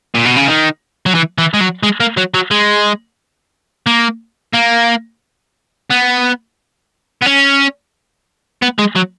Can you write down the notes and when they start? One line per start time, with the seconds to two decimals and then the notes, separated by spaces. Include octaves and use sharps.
0.15 A#2
0.25 B2
0.36 C#3
0.47 D#3
1.06 F#3
1.15 E3
1.38 E3
1.54 G#3
1.61 F#3
1.83 G#3
2.00 A#3
2.17 F#3
2.34 F#3
2.51 G#3
3.86 A#3
4.54 A#3
5.90 B3
7.22 B3
7.26 C#4
8.62 B3
8.79 G#3
8.96 F#3